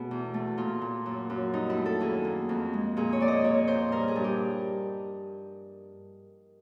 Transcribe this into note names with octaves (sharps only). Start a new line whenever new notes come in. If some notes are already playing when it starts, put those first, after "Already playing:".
Already playing: B2 A3 G#4
E2
A3
A#2 F4
A#2
F#2
F#2
G2 D#4
E4
A3
A4
D#2 G#4
A#3
F2
G#3
A#2 G#4
C#5
A#2 D5
D#5
A#2 C#5
A#2 C5
G2 A#4
G#4
G2
G4